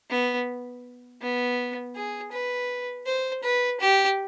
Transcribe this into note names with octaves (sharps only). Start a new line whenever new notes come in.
B3
B3
G#4
B4
C5
B4
G4